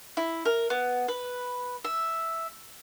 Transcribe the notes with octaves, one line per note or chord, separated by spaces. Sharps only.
E4
A#4
B3
B4
E5